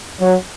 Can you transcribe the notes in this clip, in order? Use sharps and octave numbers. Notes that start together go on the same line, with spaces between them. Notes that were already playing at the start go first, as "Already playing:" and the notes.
F#3